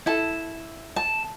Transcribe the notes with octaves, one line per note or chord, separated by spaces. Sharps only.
E4 A4 A5
A5